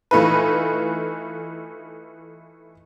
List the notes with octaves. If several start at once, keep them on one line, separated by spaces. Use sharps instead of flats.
E3 A3 D#4 F4 B4